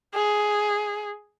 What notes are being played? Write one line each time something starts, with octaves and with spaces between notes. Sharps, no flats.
G#4